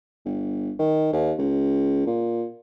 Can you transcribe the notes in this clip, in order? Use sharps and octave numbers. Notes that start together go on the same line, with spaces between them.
G1
D#3
D#2
C#2
A#2